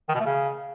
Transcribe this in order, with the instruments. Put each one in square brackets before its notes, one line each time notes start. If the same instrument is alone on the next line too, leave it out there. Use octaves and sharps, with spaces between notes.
[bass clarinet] D#3
B2
A3
C#3